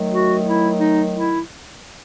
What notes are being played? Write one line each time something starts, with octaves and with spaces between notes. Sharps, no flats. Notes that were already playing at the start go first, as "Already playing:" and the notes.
Already playing: D#3 F#3 A3
F#4
E4
D#4
E4